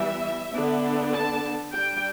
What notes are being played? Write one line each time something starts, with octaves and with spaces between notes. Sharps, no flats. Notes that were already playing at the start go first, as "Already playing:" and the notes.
Already playing: E3 G3 B3 E5
D3 B3 D4
A5
G3 D4 G5